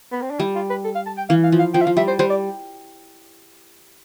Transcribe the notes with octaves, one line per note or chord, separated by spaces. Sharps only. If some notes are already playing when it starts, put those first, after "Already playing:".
B3
C4
D4
G3 E4
F4
B4
A4
F5
A5
G5
E3 F5
F5
F3
F5
F3 G5
E5
F3 F5
G3 E5
C5
G3 C5
D5